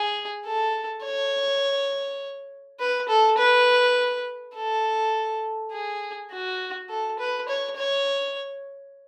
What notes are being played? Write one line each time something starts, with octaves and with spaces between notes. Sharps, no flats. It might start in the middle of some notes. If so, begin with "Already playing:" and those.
Already playing: G#4
A4
C#5
B4
A4
B4
A4
G#4
F#4
A4
B4
C#5
C#5